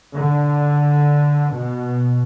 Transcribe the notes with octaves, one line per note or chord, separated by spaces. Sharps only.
D3
B2